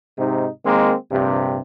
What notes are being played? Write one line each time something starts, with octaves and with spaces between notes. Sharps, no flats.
G#2 C3 D#4
D#3 G#3 A#3 C4
A#1 G2 C3